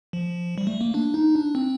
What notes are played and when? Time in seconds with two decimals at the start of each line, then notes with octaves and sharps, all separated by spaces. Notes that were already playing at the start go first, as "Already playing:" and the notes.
0.13 F3
0.58 G3
0.67 A3
0.81 A#3
0.94 D4
1.14 D#4
1.36 D4
1.55 C4